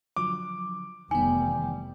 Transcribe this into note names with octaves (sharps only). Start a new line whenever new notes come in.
D3 F3 F#3 D6
F1 D#3 E3 G3 B3 G#5